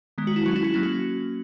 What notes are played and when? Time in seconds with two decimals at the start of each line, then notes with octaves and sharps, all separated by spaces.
0.18 D#3 G#3 B3
0.27 F#4
0.36 E4
0.46 F#3 C#4 F#4
0.56 E4
0.64 F#4
0.74 F#3 A#3 C#4 E4
0.83 F#4